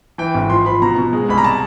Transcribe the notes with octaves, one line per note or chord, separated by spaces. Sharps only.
E3 G5
G#1
F3 C6
F3 B5
B2 A#5
B2
G#3
C2 B5
A#5
A5